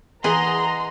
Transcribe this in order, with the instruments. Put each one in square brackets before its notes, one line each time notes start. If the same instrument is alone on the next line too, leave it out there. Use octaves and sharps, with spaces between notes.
[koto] E3 [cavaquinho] G#4 D#5 F#5 [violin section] A#5 [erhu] C6